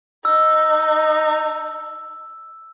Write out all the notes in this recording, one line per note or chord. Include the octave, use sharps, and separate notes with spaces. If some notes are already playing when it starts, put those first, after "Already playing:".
D#4 E6